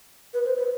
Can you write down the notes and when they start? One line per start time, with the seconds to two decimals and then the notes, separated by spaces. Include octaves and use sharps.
0.34 B4
0.45 C5
0.57 B4